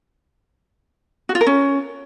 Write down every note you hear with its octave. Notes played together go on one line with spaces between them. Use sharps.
F#4
F4
A#4
C#4